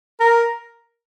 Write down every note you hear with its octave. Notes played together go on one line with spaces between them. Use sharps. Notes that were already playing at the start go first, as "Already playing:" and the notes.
A#4